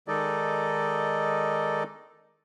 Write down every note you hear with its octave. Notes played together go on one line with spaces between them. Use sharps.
D#3 G#3 D#4 A4 D5 D#5